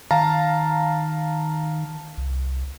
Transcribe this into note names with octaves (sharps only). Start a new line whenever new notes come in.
D#3 F5 A5 A#5
C2